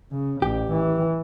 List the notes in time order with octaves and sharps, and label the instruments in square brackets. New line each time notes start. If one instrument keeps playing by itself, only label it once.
[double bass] C#3
[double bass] A1 [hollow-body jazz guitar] G4
[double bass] E3